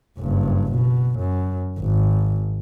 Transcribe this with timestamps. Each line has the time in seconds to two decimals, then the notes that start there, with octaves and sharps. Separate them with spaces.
0.20 F#1 G2
0.72 B2
1.19 F#2
1.80 G#1